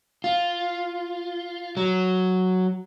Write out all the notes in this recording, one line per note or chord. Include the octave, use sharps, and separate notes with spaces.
F4
F#3